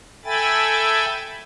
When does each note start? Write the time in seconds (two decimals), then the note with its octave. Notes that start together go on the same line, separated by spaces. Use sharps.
0.25 A4 E5 G5 G#5 B5 A6